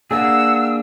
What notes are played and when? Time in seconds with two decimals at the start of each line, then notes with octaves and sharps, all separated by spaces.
0.11 A#3 D4 G#4 F#5 E6